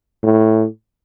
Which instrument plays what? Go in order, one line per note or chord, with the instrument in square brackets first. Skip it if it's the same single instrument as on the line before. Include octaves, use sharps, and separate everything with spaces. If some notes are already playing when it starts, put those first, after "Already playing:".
[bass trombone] A2